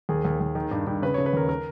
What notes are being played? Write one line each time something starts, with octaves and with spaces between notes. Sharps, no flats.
D#2 G#4
D#2
D#2
D#3
G2
G2
C#3 B4
C#3 C#5
B4
D#2 A#4
A#4